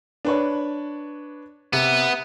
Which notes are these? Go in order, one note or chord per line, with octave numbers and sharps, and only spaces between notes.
D4 B4 C#5
C3 B3